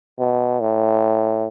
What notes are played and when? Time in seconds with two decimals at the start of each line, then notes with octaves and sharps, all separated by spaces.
0.19 B2
0.61 A2